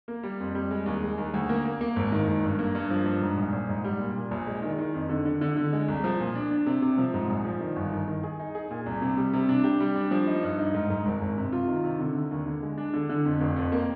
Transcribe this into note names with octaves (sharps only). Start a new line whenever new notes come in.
A#3
G3
F2
G3
G#3
D#2
G#3
D#2
D2
A#3
A#3
A#3
G#1
D#3
G#1
G2
A#3
G2
F3
G2
G#2
A#1
A#1
G#2
G3
A#2
A#2
A#1
G#3
D#3
D#3
F2
D3
D3
D3
D3
G#3
C2
F3
A#2
D4
D4
C3
C3
F3
G#2
A#1
F3
D#3
G1
D#3
D#3
G#4
D#4
G#4
A#2
C2
C3
G3
C3
D4
G4
G3
D4
F3
D#4
G2
D#4
G#2
G#2
G#1
G#1
C3
F4
D#3
C3
D3
D3
D#2
D3
G#3
D4
D3
D3
F2
F1
F2
A#3